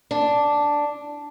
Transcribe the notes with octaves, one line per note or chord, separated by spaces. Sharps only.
D4